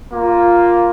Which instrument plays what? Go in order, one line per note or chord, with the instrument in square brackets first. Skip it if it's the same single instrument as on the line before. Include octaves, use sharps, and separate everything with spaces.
[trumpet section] A#3 F4